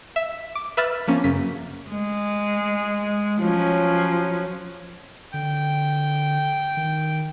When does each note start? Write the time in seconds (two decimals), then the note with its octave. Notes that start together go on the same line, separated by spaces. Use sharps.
0.16 E5
0.55 D6
0.77 B4 E5 B5 F6 A6
1.07 F3 A#3 C#4
1.24 F#2 C#3 B6
1.89 G#3
3.40 F3 F#3 C#4
5.34 D3 G5
6.77 D#3